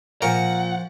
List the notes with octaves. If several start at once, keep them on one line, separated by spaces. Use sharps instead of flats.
A#2 F3 F4 A#4 F#5 C#6